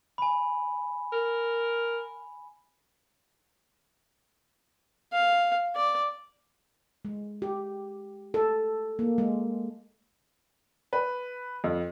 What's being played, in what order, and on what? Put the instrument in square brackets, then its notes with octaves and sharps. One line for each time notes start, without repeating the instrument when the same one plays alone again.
[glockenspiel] G#5 B5
[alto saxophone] A#4
[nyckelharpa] F5
D5
[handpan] G#3
G4
A4
A#3
G#3
[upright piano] B4
F2